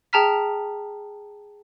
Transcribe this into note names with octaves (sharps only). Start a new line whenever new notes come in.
G#4 G5 A5 A#5 F6 B6